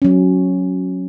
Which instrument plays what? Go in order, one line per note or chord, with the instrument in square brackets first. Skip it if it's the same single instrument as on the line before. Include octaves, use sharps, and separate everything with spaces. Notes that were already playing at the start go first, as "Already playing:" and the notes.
[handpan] F#3 C#4